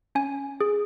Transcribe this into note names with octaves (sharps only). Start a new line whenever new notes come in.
C#4 G#5
G#4